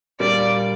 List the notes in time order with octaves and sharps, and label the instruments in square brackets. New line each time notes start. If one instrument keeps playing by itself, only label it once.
[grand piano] A#2 G3 A#3 D4 [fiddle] D5